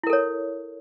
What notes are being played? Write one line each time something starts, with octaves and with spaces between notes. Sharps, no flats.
E4 A4 A#4 C#5